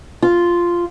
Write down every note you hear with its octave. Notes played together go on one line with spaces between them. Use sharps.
F4